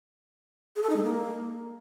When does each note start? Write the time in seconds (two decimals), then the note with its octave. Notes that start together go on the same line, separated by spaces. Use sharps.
0.76 G#4
0.83 A4
0.89 D#4
0.96 G#3
1.03 A#3